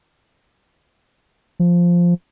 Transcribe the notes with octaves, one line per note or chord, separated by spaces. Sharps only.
F3